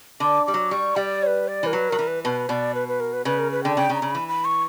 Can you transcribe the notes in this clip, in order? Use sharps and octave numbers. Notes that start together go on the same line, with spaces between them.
D3 D6
G3 D6
F#3
G3 C#6
G3 D5
C#5
B4
D5
E3 A#4
F#3 B4
F#3 A#4
E3
B4
B2 B4
B2 D5
B4
B4
A#4
B4
C#3 B4
A#4
B4
D3 G5
C#3 G5
C#3
A#5
C#3
E3 B5
B5
C#6